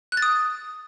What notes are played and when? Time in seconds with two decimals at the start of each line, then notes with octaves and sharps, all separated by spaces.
0.12 F#6
0.17 A6
0.22 D#6